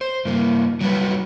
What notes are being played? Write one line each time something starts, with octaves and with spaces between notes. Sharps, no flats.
C5
G2 A#3
F#3 G3 F#4 B4